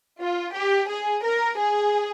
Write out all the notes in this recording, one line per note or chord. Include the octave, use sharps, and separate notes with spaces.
F4
G4
G#4
A#4
G#4